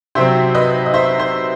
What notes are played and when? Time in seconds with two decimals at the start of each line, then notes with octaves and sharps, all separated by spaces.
0.15 C3 F#3 C4 C5 E5
0.55 B4 D#5
0.86 D#5
0.94 C5 E5
1.20 C5